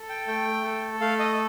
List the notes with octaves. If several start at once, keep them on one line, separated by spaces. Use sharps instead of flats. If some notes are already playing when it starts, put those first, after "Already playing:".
Already playing: A4
G5
A3 G5
A4
A3 F5
D#5